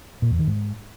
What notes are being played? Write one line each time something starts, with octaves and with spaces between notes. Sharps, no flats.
A#2
E2
D#3
G#2